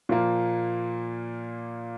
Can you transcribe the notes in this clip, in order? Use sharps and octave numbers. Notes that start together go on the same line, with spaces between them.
A#2 F3 A#3